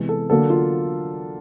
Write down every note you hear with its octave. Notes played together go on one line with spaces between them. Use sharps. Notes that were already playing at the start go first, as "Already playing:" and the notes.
Already playing: C3 E3 G#3 B3
A4
D3 F#3 A#3 A4
F4